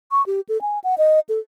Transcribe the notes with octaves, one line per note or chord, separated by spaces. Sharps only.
C#6
G4
A4
G#5
F#5
D#5
A4